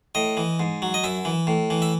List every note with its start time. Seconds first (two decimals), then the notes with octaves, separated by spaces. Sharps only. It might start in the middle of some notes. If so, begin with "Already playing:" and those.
0.15 A2 D#5
0.37 E3
0.60 G#2
0.82 F#3
0.94 D#5
1.04 F#2 E5
1.25 E3
1.47 A2
1.70 E3
1.82 E5